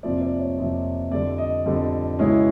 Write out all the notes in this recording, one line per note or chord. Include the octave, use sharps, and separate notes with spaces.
F2 C3 F3 A#3 D5
D5
C#5
F2 C3 F3 A#3
F2 D3 G3 D5
D#5
F2 D3 G3
C#2 B2 G#3 C#4 E4